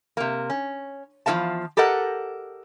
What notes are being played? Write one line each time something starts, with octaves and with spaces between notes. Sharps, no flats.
C3 A#3
C#4
E2 F3 C4 A#4 F5 A5
G4 A4 A#4 D#5 F#5